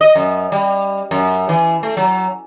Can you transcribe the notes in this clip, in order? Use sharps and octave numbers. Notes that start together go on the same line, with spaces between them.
D#5
F#2
G3
F#2
E3
A3
F#3